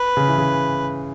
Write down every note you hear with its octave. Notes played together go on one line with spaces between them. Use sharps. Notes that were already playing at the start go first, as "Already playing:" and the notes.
Already playing: B4
C#3
E3
C#3